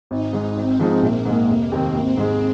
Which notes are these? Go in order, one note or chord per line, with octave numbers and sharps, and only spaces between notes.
G#1 D#4
G#2 G#3
G#1 C4
G#2 F3 G#3 D#4
A#1 A#3
G#2 G#3
F1 A#3
D#2 D#3 C4
G#1 C4
G#2 G#3